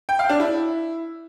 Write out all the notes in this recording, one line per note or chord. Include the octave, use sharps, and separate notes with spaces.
G5
F5
D4
E4